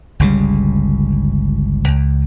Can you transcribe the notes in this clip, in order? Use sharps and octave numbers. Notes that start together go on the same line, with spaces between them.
G1 C#2 C#3 G3
C#2